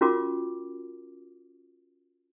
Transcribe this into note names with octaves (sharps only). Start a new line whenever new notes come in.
C#4 F4 F#4 A#4 D6